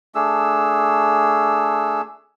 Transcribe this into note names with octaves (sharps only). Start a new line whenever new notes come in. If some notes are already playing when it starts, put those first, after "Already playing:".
A3 D4 G#4 E6